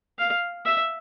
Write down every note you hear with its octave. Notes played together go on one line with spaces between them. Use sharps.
F5
E5